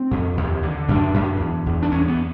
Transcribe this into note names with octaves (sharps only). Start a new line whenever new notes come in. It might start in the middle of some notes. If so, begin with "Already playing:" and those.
Already playing: C4
F2
D#2
D3
F#2 D4
F#2
E2
E2
D4
E2 C#4
B3